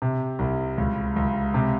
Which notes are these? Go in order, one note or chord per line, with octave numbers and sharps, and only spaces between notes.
C3
C2
C#2
C#2
C3